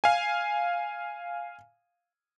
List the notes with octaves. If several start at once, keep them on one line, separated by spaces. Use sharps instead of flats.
F5 G#5